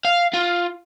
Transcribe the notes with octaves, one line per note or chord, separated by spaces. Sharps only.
F5
F4